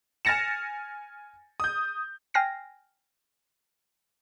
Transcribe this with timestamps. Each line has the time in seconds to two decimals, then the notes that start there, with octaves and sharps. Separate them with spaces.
0.25 G#5 F6 A6 A#6 C#7 E7
1.60 D#6 G6
2.34 G5 G#5 F6 A#6 C7